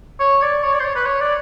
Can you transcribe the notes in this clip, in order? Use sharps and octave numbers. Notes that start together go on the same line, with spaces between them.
C#5
D5
C#5
D5
C5
C#5
B4
C#5
D5